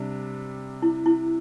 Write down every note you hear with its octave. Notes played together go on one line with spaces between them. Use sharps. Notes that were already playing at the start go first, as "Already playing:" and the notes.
Already playing: C3 G3 D4
E4
E4